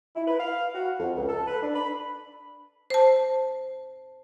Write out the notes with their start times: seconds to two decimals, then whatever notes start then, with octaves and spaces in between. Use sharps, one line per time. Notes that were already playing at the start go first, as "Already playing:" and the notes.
0.16 E4
0.28 B4
0.39 F5
0.74 F#4
0.98 F2
1.15 C#2
1.28 A4
1.48 B4
1.63 D4
1.75 B5
2.90 C5 A5